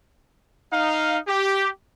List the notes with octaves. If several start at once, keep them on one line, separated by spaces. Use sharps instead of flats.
D#4 F5
G4